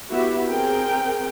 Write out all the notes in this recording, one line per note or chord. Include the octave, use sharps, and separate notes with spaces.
B3 E4 F#4 G4 E5
C4 G#4 A#4 G5